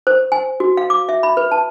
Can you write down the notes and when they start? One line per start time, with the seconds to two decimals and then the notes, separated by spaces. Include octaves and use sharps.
0.07 C5
0.32 G#5
0.60 F#4
0.77 F5
0.90 D6
1.09 E5
1.23 B5
1.37 B4
1.51 A5